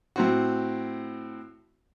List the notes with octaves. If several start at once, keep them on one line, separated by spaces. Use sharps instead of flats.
A2 C4 F#4